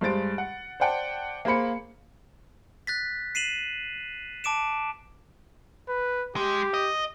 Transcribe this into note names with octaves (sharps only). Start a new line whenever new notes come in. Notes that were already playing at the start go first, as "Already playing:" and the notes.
G2 G#3 C5 A6 D7
F#5
C5 D5 F#5 G5 A5
A#3 G#4 C5 B5 C#7
F#6 A6 B6
C7 D#7 E7 F#7
A5 D6 D7 E7
B4
G#3 G4
D#5